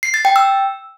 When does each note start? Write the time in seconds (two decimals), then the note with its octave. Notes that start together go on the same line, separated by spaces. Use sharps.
0.03 C7
0.14 A6
0.25 G5
0.36 E6